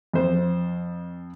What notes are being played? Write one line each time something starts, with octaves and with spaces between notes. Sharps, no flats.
F2 C5